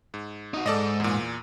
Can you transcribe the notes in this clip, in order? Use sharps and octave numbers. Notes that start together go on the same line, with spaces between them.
G#2
D#4 F#4
G#2 A4 D5 D#5
E2 A#2